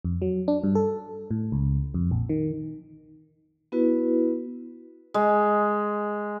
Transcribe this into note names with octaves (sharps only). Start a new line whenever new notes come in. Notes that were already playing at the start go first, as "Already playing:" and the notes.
F2
F#3
D4
G2
A4
A2
C#2
F2
A#1
D#3
B3 E4 F#4 B4
G#3